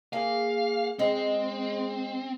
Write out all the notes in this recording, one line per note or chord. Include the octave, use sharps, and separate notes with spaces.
A#3 G#4 F5
G#3 C4